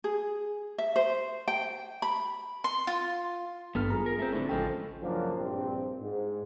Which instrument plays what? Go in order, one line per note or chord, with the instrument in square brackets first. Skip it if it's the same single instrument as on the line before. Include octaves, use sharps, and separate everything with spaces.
[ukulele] G#4
E5
C5
G5
B5
[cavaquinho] C6
F4
[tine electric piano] G#1 G2 F6 [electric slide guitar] G3 B3 A4
[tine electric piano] F4 G#4 A#5
[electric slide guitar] A#4
A3 C4
A2 D3
[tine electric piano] A1 A4 G5 [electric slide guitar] C#3 F3 G#3
[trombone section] C#2 F#2 F3 A#3 C#4 D4
A#1 G2 A#2 C4
G#2